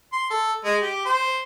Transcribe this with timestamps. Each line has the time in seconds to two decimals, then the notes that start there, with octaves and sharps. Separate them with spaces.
0.13 C6
0.31 A4
0.65 G#3
0.82 G4
1.06 C5